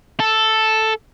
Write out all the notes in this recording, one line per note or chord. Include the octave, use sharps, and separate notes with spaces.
A4